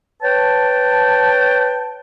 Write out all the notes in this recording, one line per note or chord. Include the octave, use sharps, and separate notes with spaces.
B4 C#5 G5 A5